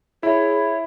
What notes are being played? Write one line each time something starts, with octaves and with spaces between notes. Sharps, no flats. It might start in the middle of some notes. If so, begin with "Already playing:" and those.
E4 G#4 C#5